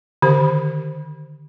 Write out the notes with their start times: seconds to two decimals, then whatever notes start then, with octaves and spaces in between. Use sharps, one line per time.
0.22 D3 D#3 G4 C5